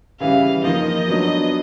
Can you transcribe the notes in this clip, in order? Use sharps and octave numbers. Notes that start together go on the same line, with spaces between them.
C#3 E3 G3 F5
F3 A#3 D#4 D#5
F#3 B3 D4